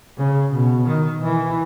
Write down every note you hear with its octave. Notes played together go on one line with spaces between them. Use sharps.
C#3
B2
D#3
E3